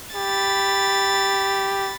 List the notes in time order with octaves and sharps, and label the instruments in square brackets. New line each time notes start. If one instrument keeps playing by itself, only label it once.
[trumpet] G4 [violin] B5 A6